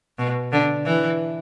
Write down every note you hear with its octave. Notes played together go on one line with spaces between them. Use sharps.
B2
D3
E3